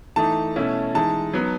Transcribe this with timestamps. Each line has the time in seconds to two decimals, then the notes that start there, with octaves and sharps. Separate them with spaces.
0.16 E3 A3 D#4 A5
0.56 B2 A3 C#4 E4
0.95 E3 G#3 D#4 A5
1.33 F#3 B3 D#4